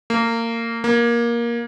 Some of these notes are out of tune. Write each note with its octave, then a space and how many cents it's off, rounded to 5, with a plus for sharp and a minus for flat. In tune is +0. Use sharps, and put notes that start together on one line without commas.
A#3 -25
A#3 +15